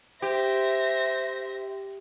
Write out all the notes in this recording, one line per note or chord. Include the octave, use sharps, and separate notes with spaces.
G4 C5 E5 A#6